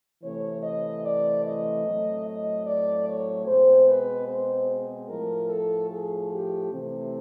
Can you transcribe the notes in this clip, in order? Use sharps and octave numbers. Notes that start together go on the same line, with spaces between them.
C3 E3 A3 C4 C#5
D#5
D5
D#5
A2 F#3 A3 C4
D#5
D5
C#5
B2 G#3 C4 C5
B4
C5
A2 F3 A3 A#4
A4
G#4
G4
C3 E3 A3 C4